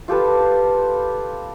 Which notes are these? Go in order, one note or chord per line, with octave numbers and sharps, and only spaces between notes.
F4 G4 A4 B4